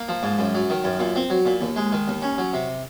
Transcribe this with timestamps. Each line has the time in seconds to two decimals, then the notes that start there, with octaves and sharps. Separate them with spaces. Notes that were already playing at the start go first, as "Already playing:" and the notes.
Already playing: A#3
0.09 F3
0.23 G#2
0.39 F#2
0.55 F#3
0.70 D#3
0.84 F#2
0.99 A#2
1.16 C4
1.30 F#3
1.45 A#2
1.61 D#2
1.76 G#3
1.92 D#3
2.08 D#2
2.22 C#4
2.38 F#3
2.53 C3